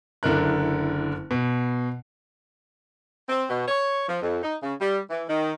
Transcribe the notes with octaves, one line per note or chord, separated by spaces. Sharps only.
F#1 D3 E4 A#4 F#6
B2
C4
B2
C#5
F3
F2
D#4
C#3
G3
E3
D#3